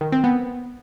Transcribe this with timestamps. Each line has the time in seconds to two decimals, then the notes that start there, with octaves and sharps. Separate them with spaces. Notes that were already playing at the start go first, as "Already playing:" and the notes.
0.01 D#3
0.12 C4
0.24 B3